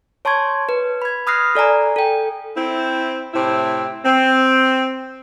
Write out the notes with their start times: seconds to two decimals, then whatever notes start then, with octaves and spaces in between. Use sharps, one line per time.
0.25 C#5 A5 C6 C#6 G#6
0.69 B4
1.02 B5 G#6
1.27 B5 D#6 F6 F#6 A#6 C7
1.55 A4 D5 G#5 A#5
1.96 A4 G5
2.56 C4 E4
3.34 A2 C3 C4 E4
4.05 C4